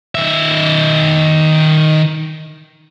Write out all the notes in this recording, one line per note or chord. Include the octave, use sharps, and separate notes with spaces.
D#3 E5